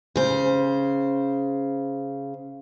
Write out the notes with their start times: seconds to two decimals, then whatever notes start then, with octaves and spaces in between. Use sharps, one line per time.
0.16 C#3 C5